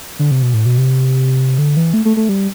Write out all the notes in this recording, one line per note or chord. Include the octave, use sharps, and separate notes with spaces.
D3
C3
B2
A2
B2
C3
D3
E3
A3
A3
A3
G3